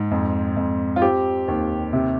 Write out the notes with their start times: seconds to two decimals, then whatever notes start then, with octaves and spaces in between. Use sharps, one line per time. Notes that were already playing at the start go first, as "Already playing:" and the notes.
Already playing: G#2
0.11 F2
0.56 F2
0.96 F4
1.02 C4 G4
1.48 D#2
1.93 C3